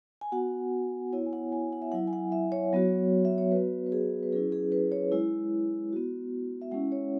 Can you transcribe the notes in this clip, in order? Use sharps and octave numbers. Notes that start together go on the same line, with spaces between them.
G#5
B3 F#4 F#5
B3 E4 C#5
G#5
F#5
G#5
F#5
E5
F#3 E4 F#5
G#5
F#5
E5
C#5
F#3 B3 F#4
E5
C#5
B3 F#4 B4
B4
G#4
B4
F#3 C#4 E4 G#4
G#4
B4
C#5
G#3 E4
B3 F#4
E5
G#3 C#4 E4 F#5
C#5